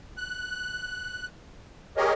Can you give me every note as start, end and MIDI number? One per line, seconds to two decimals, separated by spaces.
0.17 1.27 90
1.97 2.13 67
1.97 2.13 68
1.97 2.13 70
1.97 2.13 73
1.97 2.13 75